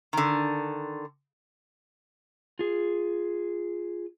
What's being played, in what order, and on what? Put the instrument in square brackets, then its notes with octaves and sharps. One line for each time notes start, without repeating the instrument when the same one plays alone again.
[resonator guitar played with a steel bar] D3 D#3
[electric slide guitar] F4 G#4